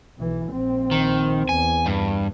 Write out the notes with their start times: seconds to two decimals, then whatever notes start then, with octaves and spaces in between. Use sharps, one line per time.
0.18 B1 E3
0.51 A#1 C4
0.91 D#3
1.49 E2 G#5
1.86 G2